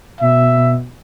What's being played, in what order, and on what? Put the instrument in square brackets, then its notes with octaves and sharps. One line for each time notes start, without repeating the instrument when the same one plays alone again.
[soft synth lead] B2 [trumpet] E5